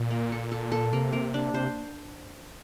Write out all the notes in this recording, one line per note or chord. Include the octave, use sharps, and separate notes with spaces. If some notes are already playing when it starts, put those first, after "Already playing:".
Already playing: A#2
A#3
A4
A4
A4
C3 A#3
A#3
D4
C3 C5